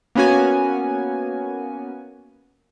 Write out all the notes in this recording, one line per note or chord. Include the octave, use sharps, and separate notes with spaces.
A#3 B3 C#4 F#4 G#5